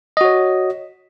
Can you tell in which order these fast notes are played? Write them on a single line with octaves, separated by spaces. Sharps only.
D#5 F#4 C#5